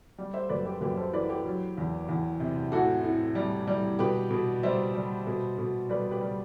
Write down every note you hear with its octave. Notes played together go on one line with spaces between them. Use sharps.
G3
C5 E5
F#2 B4 D5
G4 B4
F#2 G4 B4
A4 C5
E3 B4 D5
G4 B4
F#3
E2
E2
C3
A2 F#4 A4
A2
G3
G3
B2 G4 B4
B2
G3 C5 E5
G3
B2
B2
G3 B4 D5
G4 B4
G3